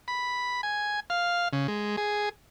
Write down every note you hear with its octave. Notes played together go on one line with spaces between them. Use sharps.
B5
G#5
F5
C#3
G#3
G#4